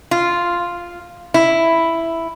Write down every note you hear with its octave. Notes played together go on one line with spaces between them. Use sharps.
F4
E4